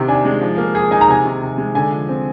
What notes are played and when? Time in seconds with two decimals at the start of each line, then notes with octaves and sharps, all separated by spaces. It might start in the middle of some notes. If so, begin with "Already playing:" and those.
Already playing: C3 D#3 G4
0.08 D4 G#5
0.25 G#3
0.41 F3
0.58 A#3
0.75 G#4 G#5
0.91 D#4 G#5
1.01 A#5
1.08 C3 G#5
1.25 D#3
1.41 C3
1.58 G#3
1.75 D3 G#5
1.92 F3
2.09 C4